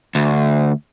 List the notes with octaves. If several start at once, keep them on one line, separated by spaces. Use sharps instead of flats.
D2